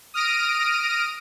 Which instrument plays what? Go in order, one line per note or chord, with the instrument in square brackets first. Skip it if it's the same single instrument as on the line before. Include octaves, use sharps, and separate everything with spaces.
[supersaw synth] D#6 F6 A#6 D7 D#7